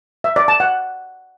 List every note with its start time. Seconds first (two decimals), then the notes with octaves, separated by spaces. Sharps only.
0.24 E5
0.36 D5
0.48 A5
0.60 F#5